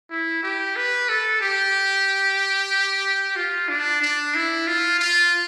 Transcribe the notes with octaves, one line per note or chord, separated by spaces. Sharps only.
E4
G4
B4
A4
G4
F4
D4
D4
E4
F4
F4